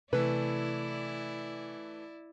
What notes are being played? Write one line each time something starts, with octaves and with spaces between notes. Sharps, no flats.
C3 E3 A3 E4 B4 D5